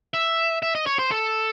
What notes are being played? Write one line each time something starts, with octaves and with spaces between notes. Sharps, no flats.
E5
E5
D#5
C#5
C5
A4